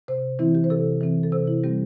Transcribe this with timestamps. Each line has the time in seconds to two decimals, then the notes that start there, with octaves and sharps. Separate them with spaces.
0.08 C3 C5
0.39 E3 C4 E4
0.55 G4
0.64 C5
0.70 C3 A4
1.01 E3 C4
1.23 A4
1.32 C3 C5
1.47 E4
1.64 G3 C4 G4